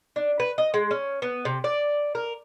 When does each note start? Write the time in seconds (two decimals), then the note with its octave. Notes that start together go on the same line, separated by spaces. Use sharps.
0.16 D4
0.40 B4
0.58 D#5
0.74 G#3
0.91 C#4
1.22 B3
1.45 C3
1.64 D5
2.15 A#4